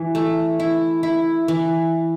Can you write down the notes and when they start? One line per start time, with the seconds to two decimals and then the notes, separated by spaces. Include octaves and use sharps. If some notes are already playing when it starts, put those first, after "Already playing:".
Already playing: E3
0.15 A3
0.60 E4
1.03 E4
1.48 E3